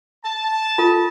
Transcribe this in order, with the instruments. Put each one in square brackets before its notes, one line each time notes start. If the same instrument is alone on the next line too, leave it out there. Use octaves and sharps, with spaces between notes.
[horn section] A5
[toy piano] F4 A4